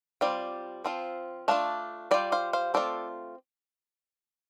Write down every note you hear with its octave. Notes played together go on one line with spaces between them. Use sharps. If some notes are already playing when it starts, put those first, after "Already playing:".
G3 C4 F4 D5 G5
F3 C4 F4
A3 D4 F4 F5 A5
G3 F4 D5 G5
C5 F5
C5 F5
A3 C4 F4 A4 D5